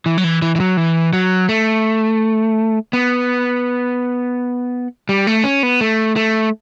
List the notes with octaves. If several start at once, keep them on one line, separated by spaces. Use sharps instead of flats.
E3
F#3
E3
E3
E3
F#3
E3
F#3
A3
B3
G3
A3
C#4
B3
A3
A3